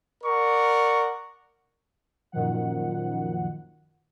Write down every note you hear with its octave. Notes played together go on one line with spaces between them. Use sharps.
A#4 D5 F#5 C#6
F#2 A#2 D#3 F3 F#5